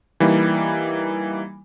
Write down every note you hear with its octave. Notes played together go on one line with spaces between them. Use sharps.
E3 G3 A#3 D#4 E4